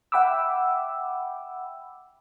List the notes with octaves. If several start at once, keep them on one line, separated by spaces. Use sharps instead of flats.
E5 F#5 G5 B5 D6 E6